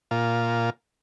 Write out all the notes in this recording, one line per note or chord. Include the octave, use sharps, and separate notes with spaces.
A#2 F4